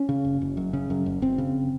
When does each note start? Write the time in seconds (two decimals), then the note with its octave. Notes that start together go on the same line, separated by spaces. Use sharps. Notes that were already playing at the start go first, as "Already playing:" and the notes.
Already playing: C#4
0.09 C#3
0.25 F#1
0.41 F#1
0.57 F#2
0.73 C#3
0.90 F#2
1.06 F#1
1.22 F#1 C4
1.38 C#3